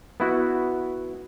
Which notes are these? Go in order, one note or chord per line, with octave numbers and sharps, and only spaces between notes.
B3 E4 F#4